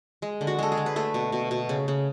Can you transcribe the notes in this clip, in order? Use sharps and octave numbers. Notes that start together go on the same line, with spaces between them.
G#3
D3
F#4
G#3 A4
G#4
D3
B4
A3 A4
B2
B2
B2
C#3
C#3